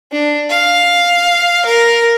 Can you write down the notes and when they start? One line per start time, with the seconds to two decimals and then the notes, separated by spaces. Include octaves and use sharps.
0.12 D4
0.50 F5
1.66 A#4